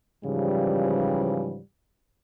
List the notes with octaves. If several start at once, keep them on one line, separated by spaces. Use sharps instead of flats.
G#2 C#3 E3 F3 G3